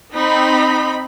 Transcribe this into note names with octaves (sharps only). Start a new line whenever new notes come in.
C4 D#4 B5